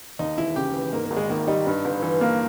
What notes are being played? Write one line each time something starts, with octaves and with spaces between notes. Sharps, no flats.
D#2 D#4
E1 E4
C#3 G4
E3
G#2 A#3
A#3
G#1
G#3
D#3 A#3
G3 D#4
G2
G1
E3
A#3